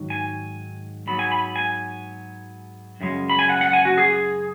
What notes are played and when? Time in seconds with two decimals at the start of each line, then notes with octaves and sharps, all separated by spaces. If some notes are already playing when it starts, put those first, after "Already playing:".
Already playing: G#2 D#3 F#3
0.10 G#5
1.07 G#2 F#3 B3 B5
1.19 G#5
1.32 B5
1.56 G#5
3.01 F#2 C#3 G#3
3.30 B5
3.39 G#5
3.49 F#5
3.61 F#5
3.73 G#5
3.85 F#4
3.98 G#4